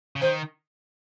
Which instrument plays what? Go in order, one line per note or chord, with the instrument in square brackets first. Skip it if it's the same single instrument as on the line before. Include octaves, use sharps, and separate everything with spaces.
[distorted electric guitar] C#3
[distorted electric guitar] D#3 [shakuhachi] C5